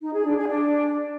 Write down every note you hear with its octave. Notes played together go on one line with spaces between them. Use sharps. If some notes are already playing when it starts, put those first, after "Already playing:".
D#4
G#4
D4
G#4
D4